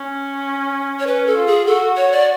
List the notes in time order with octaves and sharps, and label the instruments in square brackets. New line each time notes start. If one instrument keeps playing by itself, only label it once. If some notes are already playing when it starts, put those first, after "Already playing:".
Already playing: [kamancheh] C#4
[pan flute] C#5
[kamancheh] C#4 [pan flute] B4
[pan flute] A4
[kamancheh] F4
[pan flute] G#4
[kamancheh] F#4 [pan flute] A4
[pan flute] C#5
D5